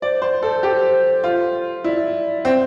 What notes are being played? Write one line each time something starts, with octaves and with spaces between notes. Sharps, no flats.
C5 D5
C5 D5
A4 C5
G4
F4
E4 D5
C4 C5